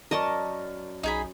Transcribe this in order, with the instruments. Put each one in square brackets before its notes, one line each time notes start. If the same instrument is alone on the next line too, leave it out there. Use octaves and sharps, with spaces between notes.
[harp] F#2 D5 C#6 [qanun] A#4 D#5 A5
[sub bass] B1 [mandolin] D#4 G#4 B5